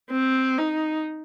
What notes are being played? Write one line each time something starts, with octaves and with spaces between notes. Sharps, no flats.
C4
D#4